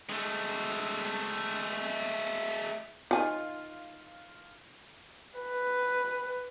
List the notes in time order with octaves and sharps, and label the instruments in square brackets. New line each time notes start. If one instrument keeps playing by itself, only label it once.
[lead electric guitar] G#3 A3
[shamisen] D#3 G#5 [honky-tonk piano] F4
[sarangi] B4